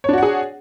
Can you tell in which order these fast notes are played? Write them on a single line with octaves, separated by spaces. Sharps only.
C#5 D4 F#4 F#5 G#4